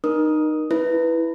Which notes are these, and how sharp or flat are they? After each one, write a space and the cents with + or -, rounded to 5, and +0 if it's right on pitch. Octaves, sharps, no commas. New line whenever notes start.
D#4 -20 A#4 +25 D#6 +5
E4 +0 B4 +0